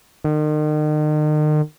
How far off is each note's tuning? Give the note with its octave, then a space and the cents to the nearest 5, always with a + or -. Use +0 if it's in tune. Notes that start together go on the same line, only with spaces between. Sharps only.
D#3 -40